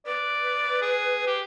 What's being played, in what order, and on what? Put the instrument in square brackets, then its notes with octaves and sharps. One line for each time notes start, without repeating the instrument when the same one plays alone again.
[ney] B4 [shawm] D5
[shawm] G#4
G4